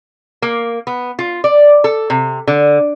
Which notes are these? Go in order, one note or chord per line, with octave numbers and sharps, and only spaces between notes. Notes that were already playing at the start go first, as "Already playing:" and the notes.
A#3
B3
F4
D5
A4
C3
D3